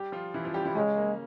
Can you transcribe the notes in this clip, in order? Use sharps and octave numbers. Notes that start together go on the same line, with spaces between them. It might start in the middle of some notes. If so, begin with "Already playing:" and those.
Already playing: G3 G4
F3 F4
E3 E4
F3 F4
G3 G4
E3 E4
C#3 G#3 C#4
A#3